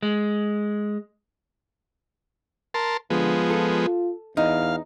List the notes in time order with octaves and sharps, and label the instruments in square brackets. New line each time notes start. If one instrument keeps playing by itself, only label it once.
[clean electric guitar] G#3
[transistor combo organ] A#4 A5 C6
[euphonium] D3 [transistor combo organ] F3 G#3 B3
[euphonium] F4 [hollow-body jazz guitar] A4
[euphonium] E2 [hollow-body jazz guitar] D#4 [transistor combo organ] F5